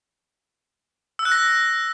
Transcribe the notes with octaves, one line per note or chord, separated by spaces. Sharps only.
E6
F#6
A#6